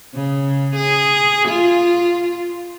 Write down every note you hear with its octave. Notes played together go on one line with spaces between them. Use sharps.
C#3
G#4
F4